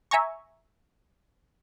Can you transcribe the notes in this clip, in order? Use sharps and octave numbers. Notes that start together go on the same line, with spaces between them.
E5 G#5 A#5 C#6